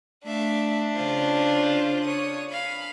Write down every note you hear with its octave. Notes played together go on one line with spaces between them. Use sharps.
A3 D4 E5 F5
C#3 F4 C5
C#5 D#6
F5 B5